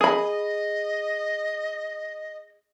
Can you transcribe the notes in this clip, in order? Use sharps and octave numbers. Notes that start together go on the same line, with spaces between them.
G#4 D#5 B5